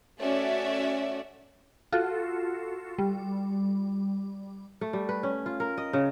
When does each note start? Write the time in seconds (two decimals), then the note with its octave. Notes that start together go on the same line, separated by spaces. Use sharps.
0.20 A3 C#4 F#4 D5 E5
1.93 F4 F#4 A4
2.98 G3
4.81 A3
4.93 G3
5.09 B4
5.23 C#4
5.46 F4
5.60 A#4
5.77 D#5
5.93 C#3